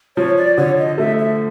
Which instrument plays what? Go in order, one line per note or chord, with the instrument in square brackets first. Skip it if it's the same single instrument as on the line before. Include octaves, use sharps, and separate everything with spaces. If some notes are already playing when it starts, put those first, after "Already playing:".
[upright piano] F3 [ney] C#5
[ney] D5
[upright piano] D3 [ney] C#5
[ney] D#5
[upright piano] A3 [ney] E5
[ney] E5